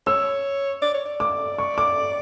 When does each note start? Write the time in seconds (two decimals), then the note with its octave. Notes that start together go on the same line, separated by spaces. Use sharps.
0.07 C#5 E6
0.82 D5
0.94 C#5
1.06 D5
1.20 D6
1.58 C#6
1.78 D6